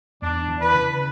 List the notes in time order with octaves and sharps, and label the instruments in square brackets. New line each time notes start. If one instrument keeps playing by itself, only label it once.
[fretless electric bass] E2 [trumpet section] D4
[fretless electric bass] E3
[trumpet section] B4
[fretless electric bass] C#3